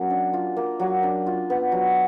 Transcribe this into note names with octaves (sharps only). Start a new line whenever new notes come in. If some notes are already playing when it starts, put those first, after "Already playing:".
Already playing: F#3 A#3 C#4
D4
F4
A#3
F#3
D4
F4
B3
F#3